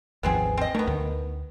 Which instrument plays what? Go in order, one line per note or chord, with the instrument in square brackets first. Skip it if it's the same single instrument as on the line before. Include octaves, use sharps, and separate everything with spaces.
[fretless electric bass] G#1 D#2 F3 [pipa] B3 C4 G#4
[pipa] C4 D#5
[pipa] D#3 B3 [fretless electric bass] A3
[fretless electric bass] D2 D3